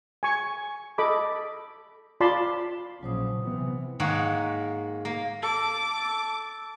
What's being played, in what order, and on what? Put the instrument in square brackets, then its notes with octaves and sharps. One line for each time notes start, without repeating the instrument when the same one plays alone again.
[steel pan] G#5 C#6
A4 D#5 B5 D6
F4 D5 A5 B5 C6
[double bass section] A#1 C#3 F3 [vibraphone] F#3 C5 D#6
[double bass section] C3 E3 B3
[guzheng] G#2 D#3 A#3 C#5 F#5
A#3
[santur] A4 [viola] D6